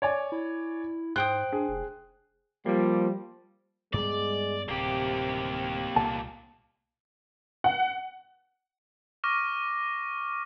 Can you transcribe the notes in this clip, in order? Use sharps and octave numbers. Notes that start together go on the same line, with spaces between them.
C#5 D5 G#5
E4
G#2 C5 G5 D#6 F#6
D4 G#4
F1
F3 G3 A#3
G2 G3 G#3 B3 D5
D1 C3 A#3 G4
C2 A#2 A5
F#5
C#6 D6 F6 A#6 D#7